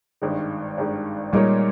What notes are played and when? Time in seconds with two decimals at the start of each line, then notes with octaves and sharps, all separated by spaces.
0.22 G#1 G2 D#3 G#3
0.77 G#1 G2 D#3 G#3
1.33 A#2 G3 G#3 D#4 A#4 C#5